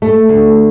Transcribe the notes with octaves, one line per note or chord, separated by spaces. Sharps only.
A3
D2